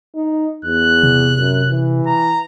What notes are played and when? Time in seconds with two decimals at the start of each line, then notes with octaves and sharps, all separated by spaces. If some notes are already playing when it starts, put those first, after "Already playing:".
0.15 D#4
0.65 E2 F#6
1.03 C3
1.39 F#2
1.70 E3
2.06 A#5